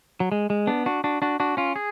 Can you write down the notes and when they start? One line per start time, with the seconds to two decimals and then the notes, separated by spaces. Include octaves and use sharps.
0.20 F#3
0.32 G#3
0.50 G#3
0.67 B3 D4
0.86 D4 F#4
1.04 D4 F#4
1.22 D4 F#4
1.40 D4 F#4
1.57 C#4 F4
1.76 G#4